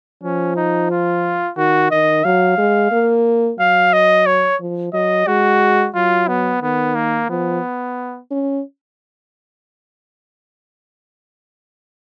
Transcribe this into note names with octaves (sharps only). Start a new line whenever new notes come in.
F3 C#4
D#4
F4
D#3 F#4
D#3 D#5
F#3 F5
G#3
A#3
F#3 F5
D#5
C#5
F3
F#3 D#5
G#3 F#4
F#3 F4
B3
D#3 B3
A#3
F3 B3
C#4